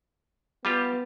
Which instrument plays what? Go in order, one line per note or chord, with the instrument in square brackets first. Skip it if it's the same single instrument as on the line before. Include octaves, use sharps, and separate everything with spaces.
[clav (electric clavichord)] G3 F4 G4 [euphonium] B3